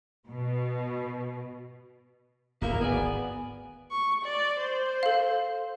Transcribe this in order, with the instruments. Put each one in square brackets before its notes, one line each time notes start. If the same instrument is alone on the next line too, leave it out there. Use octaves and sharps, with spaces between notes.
[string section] B2
[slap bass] D1 G#1 [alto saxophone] A#3 [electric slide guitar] B3 E4 A#4
[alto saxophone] B3 [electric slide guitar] G#4 D5 G#5
[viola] C#6
D5
C5
[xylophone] A4 F5